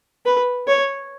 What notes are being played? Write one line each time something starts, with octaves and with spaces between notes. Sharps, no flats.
B4
C#5